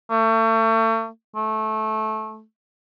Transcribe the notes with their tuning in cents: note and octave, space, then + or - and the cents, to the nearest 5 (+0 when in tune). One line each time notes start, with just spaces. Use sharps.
A3 +35
A3 -15